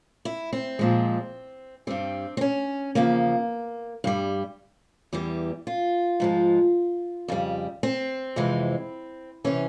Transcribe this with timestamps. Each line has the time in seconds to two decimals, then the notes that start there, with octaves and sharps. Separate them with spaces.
0.25 E4
0.53 C4
0.79 A#2 F3 G#3
1.87 G2 G3 C4
2.37 C4
2.41 C#4
2.95 E2 C#3 F3 A#3
4.04 G2 G3
5.13 E2 E3 G3
5.67 F4
6.20 G#2 F3 G#3
7.28 F2 C#3 G3
7.83 C4
8.36 F2 C3 E3 G#3
9.44 C3 E3 C#4